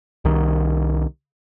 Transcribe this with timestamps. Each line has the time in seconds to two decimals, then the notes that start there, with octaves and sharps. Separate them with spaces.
0.25 C2 D#3